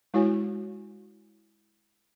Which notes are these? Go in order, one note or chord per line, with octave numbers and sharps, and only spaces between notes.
G#3 E4 F#4 C#5 G#5